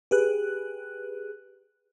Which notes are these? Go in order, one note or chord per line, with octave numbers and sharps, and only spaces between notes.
G4 G#4 B4 F#6